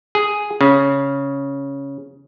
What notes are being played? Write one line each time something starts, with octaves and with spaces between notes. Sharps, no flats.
G#4
C#3